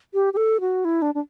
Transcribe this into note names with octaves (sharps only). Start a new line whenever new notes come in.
G4
G4
A4
F#4
E4
D4
D4